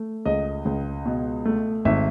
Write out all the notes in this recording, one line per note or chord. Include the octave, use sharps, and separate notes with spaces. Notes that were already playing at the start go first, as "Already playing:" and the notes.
Already playing: A3
C#2 D#5
C#2
B2
A3
G#1 E5